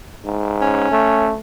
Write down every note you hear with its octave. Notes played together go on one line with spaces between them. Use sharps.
G#2
C#4
A3